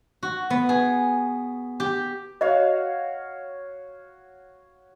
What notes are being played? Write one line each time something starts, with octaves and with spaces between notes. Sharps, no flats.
F#4
B3
G#4
G4
F#4 C#5 D#5 F5